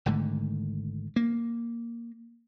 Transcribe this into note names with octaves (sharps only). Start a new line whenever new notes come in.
G#1 G#2 D3 A3
A#3